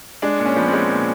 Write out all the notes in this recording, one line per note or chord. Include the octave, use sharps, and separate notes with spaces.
G#3 D4
A#2
C#4
F3 B3
C4
G#3
A#2